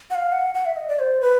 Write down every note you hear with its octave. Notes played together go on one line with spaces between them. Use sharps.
F#5
F5
F#5
F#5
E5
D#5
D5
C5
B4